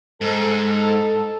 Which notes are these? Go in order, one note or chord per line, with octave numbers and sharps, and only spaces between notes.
G#2 A4